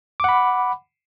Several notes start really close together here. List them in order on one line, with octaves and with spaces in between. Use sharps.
D6 F#5 B5